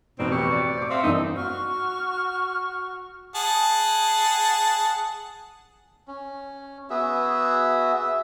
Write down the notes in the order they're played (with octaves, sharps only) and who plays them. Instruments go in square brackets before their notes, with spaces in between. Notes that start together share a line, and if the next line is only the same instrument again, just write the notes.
[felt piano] A1 F2 [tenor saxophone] B2 [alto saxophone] C4 [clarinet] D#4
[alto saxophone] G4 [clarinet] C#6
[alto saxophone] D5
[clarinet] C5 [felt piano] D6 C#7
[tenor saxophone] C4 [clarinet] E5 [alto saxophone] F5
[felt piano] F1 F#2 E3 [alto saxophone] D#4
[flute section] F#4 C#6 F6
[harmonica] G#4 F#5 A5
[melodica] C#4
B3 F#4 G#4 E5
E5